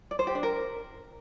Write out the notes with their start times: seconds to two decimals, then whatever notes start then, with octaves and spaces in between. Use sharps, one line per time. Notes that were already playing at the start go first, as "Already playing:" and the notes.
0.11 D5
0.19 C5
0.27 G4
0.35 D4
0.43 A#4